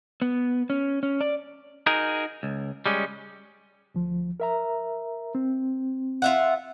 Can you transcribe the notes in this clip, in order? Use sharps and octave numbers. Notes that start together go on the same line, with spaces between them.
B3
C#4
C#4
D5
D#4 F#4 G#4 A#4
C#2
G3 G#3 C#4
D2 F3
A#4 E5 A#5
C4
F4 E5 F#5